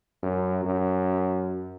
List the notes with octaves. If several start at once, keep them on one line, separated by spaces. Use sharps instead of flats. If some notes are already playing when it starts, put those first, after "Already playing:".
F#2
F#2